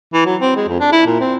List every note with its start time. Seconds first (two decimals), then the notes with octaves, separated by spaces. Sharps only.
0.14 E3
0.26 F#3
0.41 C4
0.56 G#3
0.68 F2
0.80 D4
0.92 E4
1.06 A#2
1.20 C4